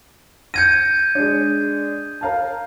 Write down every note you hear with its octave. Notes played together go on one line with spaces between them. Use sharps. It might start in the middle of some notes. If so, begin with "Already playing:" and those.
G6 G#6 A#6 C#7 D#7
G#3 D4
A#4 F5 A5